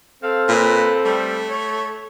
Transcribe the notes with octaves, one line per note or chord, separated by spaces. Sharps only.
C4 A4 F5
A#2 B4
G3 A3
C#5